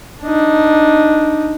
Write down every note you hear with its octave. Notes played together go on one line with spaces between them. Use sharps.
D4 D#4